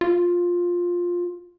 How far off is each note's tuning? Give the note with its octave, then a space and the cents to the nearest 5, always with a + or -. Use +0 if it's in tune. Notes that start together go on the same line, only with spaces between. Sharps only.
F4 +10